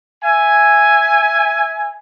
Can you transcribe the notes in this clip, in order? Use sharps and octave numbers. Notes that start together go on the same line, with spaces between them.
E5 G#5